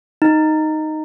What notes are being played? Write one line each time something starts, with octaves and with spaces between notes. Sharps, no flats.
D#4